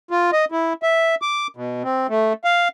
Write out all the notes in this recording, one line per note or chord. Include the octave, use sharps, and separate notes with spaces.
F4
D#5
E4
E5
D6
B2
C4
A3
F5